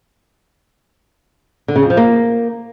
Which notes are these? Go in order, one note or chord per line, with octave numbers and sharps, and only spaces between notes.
D3
C#3
F2
F3
A#3